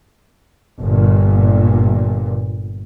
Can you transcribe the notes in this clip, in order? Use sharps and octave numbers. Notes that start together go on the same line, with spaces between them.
G1 A#2